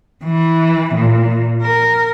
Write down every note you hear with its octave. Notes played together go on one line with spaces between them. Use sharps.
E3
A#2
A#4